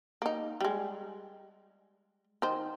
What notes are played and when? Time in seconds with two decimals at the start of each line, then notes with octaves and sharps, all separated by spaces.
0.22 A#3 D#4
0.61 G3 G#3
2.42 D#3 C5